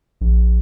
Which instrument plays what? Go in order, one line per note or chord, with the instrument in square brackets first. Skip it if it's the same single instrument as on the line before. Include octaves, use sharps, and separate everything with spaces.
[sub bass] A#1